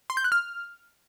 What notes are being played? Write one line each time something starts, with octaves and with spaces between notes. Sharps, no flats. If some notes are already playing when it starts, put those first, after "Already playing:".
C6
G6
F#6
F6